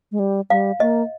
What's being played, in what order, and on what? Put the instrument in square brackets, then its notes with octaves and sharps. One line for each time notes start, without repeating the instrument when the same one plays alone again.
[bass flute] G#3
G3
[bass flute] G3 [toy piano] F5
[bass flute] A#3 [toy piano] D#5